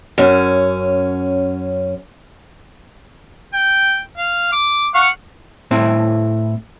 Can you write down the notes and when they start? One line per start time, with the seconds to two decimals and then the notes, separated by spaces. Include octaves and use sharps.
0.18 F#2 C#4
3.53 G5
4.17 F5
4.52 D6
4.95 F5 F#5 C#6
5.71 A2 C4 E4